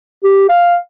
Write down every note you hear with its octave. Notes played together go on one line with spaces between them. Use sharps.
G4
F5